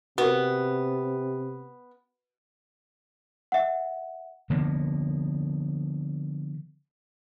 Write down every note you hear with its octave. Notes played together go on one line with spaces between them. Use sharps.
C3 B3 F#4 A#4
E5 F#5
D3 F3 A#3 B3